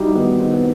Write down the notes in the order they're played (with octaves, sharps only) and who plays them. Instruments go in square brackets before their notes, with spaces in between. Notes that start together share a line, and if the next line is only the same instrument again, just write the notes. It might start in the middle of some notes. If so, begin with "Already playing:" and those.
Already playing: [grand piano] G3 [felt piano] D#4 E4 F#4 G4
[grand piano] D#3 [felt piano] B3
[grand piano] D#3 [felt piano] C4
[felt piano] B3